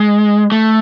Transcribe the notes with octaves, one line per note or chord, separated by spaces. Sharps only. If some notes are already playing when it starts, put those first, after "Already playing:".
Already playing: G#3
A3